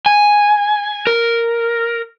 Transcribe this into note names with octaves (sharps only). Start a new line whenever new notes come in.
G#5
A#4